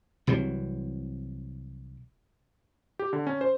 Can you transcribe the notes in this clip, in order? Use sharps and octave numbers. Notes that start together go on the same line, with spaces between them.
C2 C3 E3 F#3
G4
D3
C#4
C5